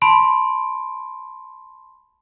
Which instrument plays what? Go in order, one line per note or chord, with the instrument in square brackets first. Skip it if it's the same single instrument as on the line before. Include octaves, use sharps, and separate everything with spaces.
[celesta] A5 B5 C6 D7